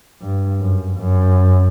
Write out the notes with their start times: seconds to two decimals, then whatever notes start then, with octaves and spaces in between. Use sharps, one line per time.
0.22 G2
0.60 F#2
0.98 F#2